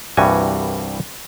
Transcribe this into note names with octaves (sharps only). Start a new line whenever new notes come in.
C2 G2 E3 G3 F#4 G#5